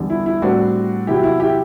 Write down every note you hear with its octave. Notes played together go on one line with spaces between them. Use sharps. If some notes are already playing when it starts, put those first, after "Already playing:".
Already playing: E2 D3 G3
E4
E4
A2 G3 C4 D4 F#4
E2 C3 F#3 E4 G4
E4
E4 G4